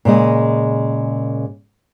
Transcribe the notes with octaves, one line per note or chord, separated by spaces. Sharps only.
A#2 C#3 G#3 D#5